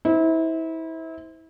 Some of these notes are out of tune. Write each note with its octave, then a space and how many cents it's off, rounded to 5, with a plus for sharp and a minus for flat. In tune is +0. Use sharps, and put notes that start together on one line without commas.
E4 -30 C5 -20